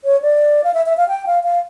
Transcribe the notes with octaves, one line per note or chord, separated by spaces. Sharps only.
C#5
D5
F5
E5
E5
F5
G5
F5
F5